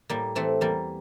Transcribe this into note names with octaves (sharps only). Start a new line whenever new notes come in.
A2 G3 A#3
E3 A3 C4
E2 G3 A#3